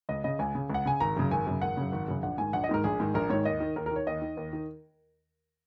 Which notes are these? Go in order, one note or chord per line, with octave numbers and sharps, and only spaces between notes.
C#2 D#5
C#3 D#5
C#2 G#5
C#3
C#2 F#5
C#3 G#5
G#1 A#5
F#2 C#3
G#1 G#5
F#2 C#3
G#1 F#5
F#2 C#3
G#1
F#2 C#3
A#1 F#5
G#2 D#3 G#5
A#1 F#5
D#5
G#2 D#3 A#4
A#1 G#4
G#2 D#3
A#1 A#4
G#2 D#3 C#5
D#2 D#5
D#3
D#2 A#4
A#4
D#3 C#5
D#2 D#5
D#3
D#2
D#3